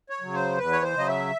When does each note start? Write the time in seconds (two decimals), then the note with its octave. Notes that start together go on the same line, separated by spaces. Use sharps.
0.10 C#5
0.21 C#3 F#3
0.33 C5
0.58 E2 B4
0.72 C#5
0.83 C5
0.95 C#3 F#3 D#5
1.08 E5